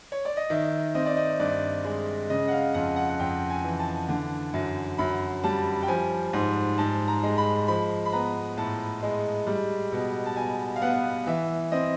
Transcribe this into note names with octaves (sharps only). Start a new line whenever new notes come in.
C#5
D5
D#5
D#3 E5
C4 D#5
D5
D#5
G2 D5
G#3
C#3 D#5
F#5
F5
F2 F#5
F#5
F#5
F2 G5
G#5
E3
A5
D3
F#2
F#2 B5
G3 A5
G5
F3 G#5
G#2
G#2 A5
A#5
G#3
B5
F3 B5
B5
B3 A#5
A2 A5
G#3
G3
B2
A5
B2 G#5
F5
B3 F#5
E3 E5
C4 D#5